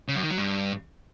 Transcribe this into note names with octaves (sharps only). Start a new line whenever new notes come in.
C#3
F#2
D#3
F#3
G2